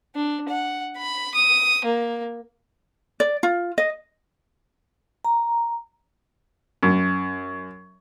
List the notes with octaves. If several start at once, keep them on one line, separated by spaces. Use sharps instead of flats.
D4
F#5
B5
D#6
A#3
D5
F4
D#5
A#5
F#2